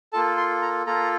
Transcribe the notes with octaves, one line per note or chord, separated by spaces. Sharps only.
A#3 F4 A4 A5
C6
A#5
A#3 F4 A4 A#5